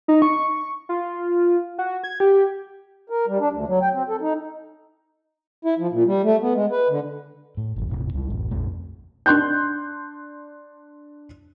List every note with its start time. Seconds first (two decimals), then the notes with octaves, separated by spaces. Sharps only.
0.08 D#4
0.22 C#6
0.89 F4
1.78 F#4
2.04 G#6
2.20 G4
3.10 A#4
3.27 G3
3.40 D4
3.52 D2
3.68 F#3
3.81 G5
3.94 C4
4.09 A4
4.21 D#4
5.65 E4
5.79 F3
5.92 A#2
6.06 G3
6.24 A3
6.42 B3
6.55 G#3
6.72 B4
6.90 D3
7.57 A2
7.76 G#1 F2
7.90 D#1 G#1 C3
8.14 C#2 F#3 G3
8.30 D1 A1
8.51 A#1 F2 A#2 A3
9.26 D4 C6 F#6 G6